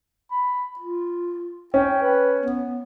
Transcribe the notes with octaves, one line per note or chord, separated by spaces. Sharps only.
B5
F4
C#4 G5
B4
B3